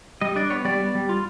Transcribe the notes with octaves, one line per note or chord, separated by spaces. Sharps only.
G3 D#5
D4 D5
B3 C#5
G3 D5
B3
G3
F4